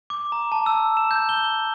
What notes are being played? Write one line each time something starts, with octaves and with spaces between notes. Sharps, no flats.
D6
A#5
A5
E6
E7
G6
G7